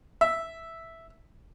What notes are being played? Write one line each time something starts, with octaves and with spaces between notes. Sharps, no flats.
E5